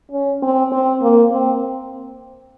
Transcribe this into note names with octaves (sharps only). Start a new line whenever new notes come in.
C#4
C4
C4
A#3
C4